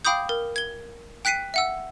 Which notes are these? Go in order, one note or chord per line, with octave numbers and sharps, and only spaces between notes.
F5 G5 B5 D6 D#6 G6
A#4
G#6 G7
G5 F#6 B6 C7 D#7
E5 F#5 E6